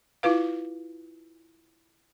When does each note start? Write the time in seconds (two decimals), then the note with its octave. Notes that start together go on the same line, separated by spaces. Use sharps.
0.23 E4 F4 B4 F5